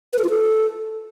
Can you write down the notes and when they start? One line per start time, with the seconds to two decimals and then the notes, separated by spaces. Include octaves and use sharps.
0.13 B4
0.19 A4
0.24 F4
0.30 A4